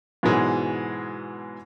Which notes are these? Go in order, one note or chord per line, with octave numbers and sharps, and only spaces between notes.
G#2 B2 E3 F#3 G#3